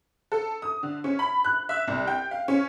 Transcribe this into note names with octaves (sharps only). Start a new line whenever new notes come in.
A4
D#6
D3
C#4
B5
F#6
E5
C2
G5
F5
C#4